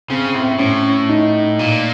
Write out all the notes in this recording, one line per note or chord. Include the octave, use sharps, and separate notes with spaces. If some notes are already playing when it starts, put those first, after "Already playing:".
C#3 C4
C4
A2
C4
A2 C#4
D#4
A#2